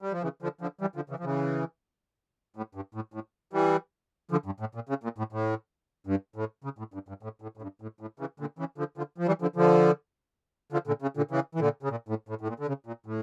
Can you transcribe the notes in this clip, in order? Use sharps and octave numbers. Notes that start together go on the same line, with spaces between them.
G3
F3
C#3 E3
D3 F3
D3 F3
E3 G3
D3 F3
C#3 E3
F3
C#3 E3
A2
G2
A2
A2
E3 G3
D3 F3
G2
A2
A#2
C#3
A#2
A2
A2
G2
A2
C#3
A2
G2
G2
A2
A2
A2
G2
A2
A2
C#3 E3
A#2 D3
C#3 E3
D3 F3
D3 F3
F3
E3 G3
D3 F3
D3 F3
D3 F3
A#2 D3
C#3
A#2 D3
C#3 E3
E3
A#2 D3
C#3
A#2
A2
A2
A2
A#2
D3
C#3
A#2
A2